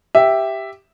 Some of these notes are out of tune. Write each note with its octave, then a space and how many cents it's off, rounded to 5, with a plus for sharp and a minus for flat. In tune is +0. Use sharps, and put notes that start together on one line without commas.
G4 +0 E5 +0